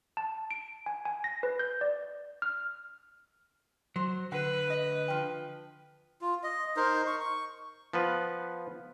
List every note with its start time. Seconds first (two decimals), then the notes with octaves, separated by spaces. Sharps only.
0.17 A5
0.51 D7
0.86 G#5
1.05 G#5
1.24 A#6
1.43 B4
1.59 G6
1.81 D5
2.42 F6
3.96 F#3 C5
4.32 D3 B4 F#5
4.67 A3 D#5
5.08 F3 G5
6.21 F4
6.43 D#5
6.76 D#4 A#4 C5
7.07 C#6
7.20 C#6
7.93 F3 B3 B4